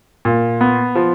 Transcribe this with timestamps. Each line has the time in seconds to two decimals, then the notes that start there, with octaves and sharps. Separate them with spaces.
0.25 A#2
0.61 B3
0.95 F3